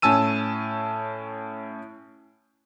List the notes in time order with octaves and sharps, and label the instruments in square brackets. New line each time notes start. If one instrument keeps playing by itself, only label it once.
[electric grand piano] A2 C#4 G#5 A5 E6 D#7